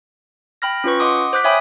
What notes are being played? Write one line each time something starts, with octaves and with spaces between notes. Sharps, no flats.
G5 B5 F6 A#6
C#4 F4 B4 C#6
D#5 F#5 C6 D6 D#6
C5 D6 F#6 G6 B6
C#5 E5 G5 G#5 B5 D#6